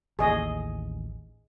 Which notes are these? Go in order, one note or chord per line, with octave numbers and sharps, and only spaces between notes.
A1 D#2 G#4 D#5